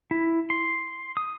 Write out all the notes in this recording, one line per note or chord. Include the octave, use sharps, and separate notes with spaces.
E4
C6
D#6